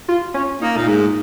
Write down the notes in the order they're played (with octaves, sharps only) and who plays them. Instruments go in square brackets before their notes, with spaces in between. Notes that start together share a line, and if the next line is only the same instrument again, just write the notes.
[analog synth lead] F4
C#4
[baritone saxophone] A#3 [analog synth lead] D#4
[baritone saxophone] A#2
G#2